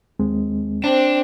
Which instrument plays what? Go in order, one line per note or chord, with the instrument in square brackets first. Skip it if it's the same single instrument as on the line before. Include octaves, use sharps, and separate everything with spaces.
[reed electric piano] D#2 G#3 C4
[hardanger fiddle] C4 [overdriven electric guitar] D4